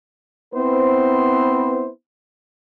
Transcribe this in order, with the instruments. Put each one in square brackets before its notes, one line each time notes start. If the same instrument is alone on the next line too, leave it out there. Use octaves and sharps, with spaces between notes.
[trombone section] B3 C4 E4 B4 C5